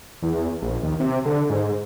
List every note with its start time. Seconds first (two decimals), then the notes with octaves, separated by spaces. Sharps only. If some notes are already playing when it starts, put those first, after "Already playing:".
0.22 E2
0.62 A#1
0.83 D#2
1.00 C3
1.25 D3
1.50 G#2